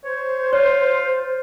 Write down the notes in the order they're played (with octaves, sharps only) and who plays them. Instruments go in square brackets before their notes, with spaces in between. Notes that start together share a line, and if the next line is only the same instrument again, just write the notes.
[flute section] C5 [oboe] C#5
[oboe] F4 [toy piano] C#5